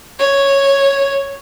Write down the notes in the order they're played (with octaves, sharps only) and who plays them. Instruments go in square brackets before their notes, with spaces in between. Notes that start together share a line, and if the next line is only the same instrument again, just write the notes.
[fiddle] C#5